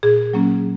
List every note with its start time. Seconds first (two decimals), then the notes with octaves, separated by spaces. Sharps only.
0.03 A#2 G#4
0.34 F#3 A#3 C#4